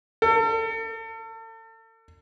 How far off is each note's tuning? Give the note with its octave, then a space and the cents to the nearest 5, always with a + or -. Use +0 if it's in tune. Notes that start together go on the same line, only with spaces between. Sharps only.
A4 +40